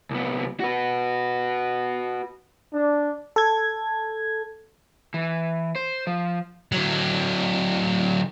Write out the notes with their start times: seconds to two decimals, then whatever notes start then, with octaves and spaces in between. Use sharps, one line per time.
0.11 C2 B3
0.60 F#4 B4
2.74 D4
3.36 A4 G#6
5.14 E3
5.76 C5
6.07 F3
6.72 D3 F#3